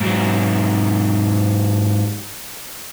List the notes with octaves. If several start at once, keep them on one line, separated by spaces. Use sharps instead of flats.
G#2 F#3